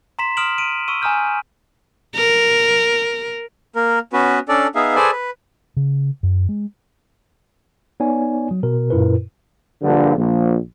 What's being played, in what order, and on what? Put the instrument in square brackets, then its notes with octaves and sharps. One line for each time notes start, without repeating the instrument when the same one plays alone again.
[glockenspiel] A#5 C6 B6 E7
C6 D#6 F6 D7 E7 F#7
D7 D#7
C#6 E6 D#7
G#5 A#5 D#6 F6 G6
[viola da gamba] A#4
[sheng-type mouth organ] A#3 A#4
B3 C#4 F#4 B4
C#4 D4 A4 D5
B3 D#4 G#4 E5 F5
G#4 A4 B4 C5 D5 G#5
B4
[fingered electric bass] C#3
F#2
G#3
[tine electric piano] B3 D#4 C#5 D5 G#5
F#3
B2 A#4
F#2 A#2 E4 A#4 B4
[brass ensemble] A#1 G2 A#2 D3
A#1